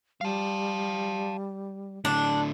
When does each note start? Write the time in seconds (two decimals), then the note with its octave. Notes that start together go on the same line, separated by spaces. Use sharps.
0.21 G3 F5 A5
2.05 A2 D3 D4